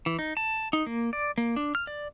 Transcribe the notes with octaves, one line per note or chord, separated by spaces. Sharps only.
E3
D#4
A5
D#4
A#3
D5
A#3
D4
F6
D5